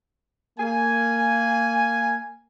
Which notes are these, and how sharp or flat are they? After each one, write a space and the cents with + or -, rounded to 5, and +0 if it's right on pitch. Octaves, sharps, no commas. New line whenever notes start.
A#3 -20 G#5 +0